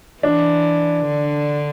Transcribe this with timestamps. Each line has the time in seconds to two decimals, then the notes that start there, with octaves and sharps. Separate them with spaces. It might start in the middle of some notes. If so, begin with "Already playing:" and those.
0.23 E3 D4
1.07 D3